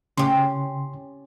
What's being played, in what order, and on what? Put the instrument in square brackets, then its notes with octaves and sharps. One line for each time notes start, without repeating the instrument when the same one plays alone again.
[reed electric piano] C#3 C6 [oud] C#4 G4